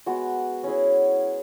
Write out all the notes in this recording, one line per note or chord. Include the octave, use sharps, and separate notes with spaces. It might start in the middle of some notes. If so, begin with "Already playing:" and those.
G#3 B3 F#4
C#4 E4 G#4